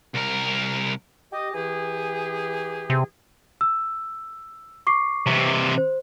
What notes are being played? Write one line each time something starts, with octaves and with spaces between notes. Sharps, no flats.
C2 A#4
G4 D#5
E3 G4 G#4
C3
E6
C#6 D6 C7
C3 E3
C5